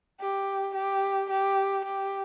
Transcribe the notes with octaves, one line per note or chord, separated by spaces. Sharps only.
G4
G4
G4
G4